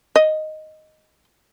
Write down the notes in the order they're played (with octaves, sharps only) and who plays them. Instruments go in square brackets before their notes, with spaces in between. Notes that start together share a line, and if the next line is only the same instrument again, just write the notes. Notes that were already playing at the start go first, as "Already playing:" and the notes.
[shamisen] D#5